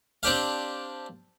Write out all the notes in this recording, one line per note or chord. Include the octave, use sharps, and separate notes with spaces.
C4 D4 G4 F5